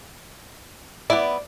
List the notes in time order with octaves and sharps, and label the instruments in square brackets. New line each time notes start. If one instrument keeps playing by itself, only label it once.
[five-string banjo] B3 E4 [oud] D5